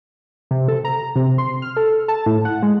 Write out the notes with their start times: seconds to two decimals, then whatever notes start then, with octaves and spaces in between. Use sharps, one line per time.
0.51 C3
0.68 A4
0.85 A#5
1.16 C3
1.38 C6
1.62 F6
1.77 A4
2.08 A5
2.26 A2
2.45 F#5
2.63 G#3